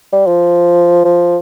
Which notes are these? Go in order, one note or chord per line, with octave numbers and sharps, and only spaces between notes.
G3
F3
F3